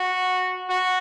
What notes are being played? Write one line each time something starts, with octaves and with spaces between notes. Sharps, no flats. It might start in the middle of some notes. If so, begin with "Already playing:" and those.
Already playing: F#4
F#4